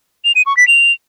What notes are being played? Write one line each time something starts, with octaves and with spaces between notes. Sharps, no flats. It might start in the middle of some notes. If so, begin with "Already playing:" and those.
F7
D#7
C#6
B6
F7